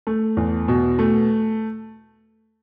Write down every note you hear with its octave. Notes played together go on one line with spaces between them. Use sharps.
A3
E2
B2
A3